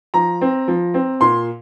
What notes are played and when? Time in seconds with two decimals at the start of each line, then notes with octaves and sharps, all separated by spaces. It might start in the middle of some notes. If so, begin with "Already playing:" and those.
0.14 F3 A#5
0.41 C4
0.68 F3
0.94 C4
1.21 A#2 C6